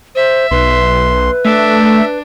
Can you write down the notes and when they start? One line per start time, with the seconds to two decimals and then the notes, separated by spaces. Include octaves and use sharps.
0.15 C5 E5
0.51 B1 B4 C6
1.45 A3 D4 E5